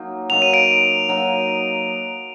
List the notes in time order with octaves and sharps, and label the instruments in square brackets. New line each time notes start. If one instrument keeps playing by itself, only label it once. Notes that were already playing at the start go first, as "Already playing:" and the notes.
Already playing: [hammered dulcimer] F#3 A#3 D#4
[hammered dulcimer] F#3 A#3 D#4 [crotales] F7
[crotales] D#7
D7 F7
[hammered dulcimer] F#3 A#3 D#4